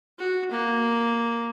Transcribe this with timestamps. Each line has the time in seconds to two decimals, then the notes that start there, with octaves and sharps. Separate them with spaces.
0.19 F#4
0.51 A#3